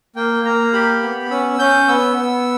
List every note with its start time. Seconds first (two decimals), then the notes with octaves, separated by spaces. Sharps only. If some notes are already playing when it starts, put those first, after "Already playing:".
0.16 A#3 G5
0.45 A#3 A#5
0.73 G4 B5
1.02 B3
1.31 C#4 E6
1.59 C#4 G6
1.88 B3 E6
2.17 B3